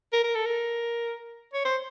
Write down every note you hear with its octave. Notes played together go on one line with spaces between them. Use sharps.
A#4
A#4
A4
A#4
C#5
C5